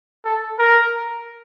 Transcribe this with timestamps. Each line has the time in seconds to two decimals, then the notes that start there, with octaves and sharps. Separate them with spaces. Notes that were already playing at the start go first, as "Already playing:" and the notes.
0.25 A4
0.59 A#4